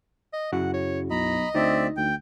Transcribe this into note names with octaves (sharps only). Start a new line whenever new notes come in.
D#5
F#2 C#3 E4 F#4 F#5
C#5
B1 D#5 A#5 B5
D2 C4 D#4 D5 E5
D2 G5